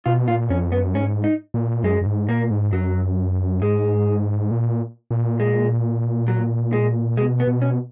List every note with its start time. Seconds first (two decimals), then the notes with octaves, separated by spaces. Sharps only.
0.06 B2 F4
0.28 A#2 F4
0.50 F2 C#4
0.72 F#2 B3
0.95 G#2 C#4
1.24 D#4
1.54 A#2
1.83 F#2 G#3
2.01 F#2
2.06 G#2
2.29 A#2 A#3
2.51 G#2
2.73 F#2 F#3
3.62 G#2 G#3
4.51 A#2
5.11 A#2
5.40 G#3
6.28 F#3
6.73 G#3
7.17 B2 G#3
7.40 B3
7.47 B2
7.62 C#4